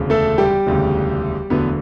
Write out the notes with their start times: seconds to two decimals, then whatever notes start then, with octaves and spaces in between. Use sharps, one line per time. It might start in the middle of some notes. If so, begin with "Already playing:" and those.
Already playing: E1 D2 C#3
0.10 A3 A4
0.38 G3 G4
0.67 E1 D2 C#3
1.50 E1 D2 D3 F#3 B3 B4